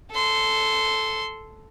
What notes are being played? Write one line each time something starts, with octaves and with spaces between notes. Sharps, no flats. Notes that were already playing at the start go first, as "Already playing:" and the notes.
A4 C6